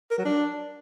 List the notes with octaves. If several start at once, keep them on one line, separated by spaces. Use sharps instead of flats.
A#4
F#3
D4